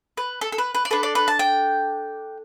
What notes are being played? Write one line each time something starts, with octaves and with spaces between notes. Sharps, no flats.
B4
A4
A4
B4
B4
D5
D4 A4 B4
D5
B4
A5
G5